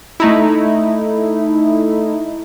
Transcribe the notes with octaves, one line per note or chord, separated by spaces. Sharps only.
A3 D#4 E4